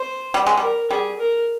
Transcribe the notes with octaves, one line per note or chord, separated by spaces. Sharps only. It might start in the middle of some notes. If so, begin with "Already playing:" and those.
Already playing: C5
G3
G#3
G3 A#4
G3 G#4
A#4